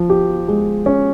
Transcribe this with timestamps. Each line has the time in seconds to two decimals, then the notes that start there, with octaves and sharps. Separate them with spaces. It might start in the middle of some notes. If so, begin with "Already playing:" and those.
Already playing: F3
0.10 G4
0.48 G#3
0.86 C#4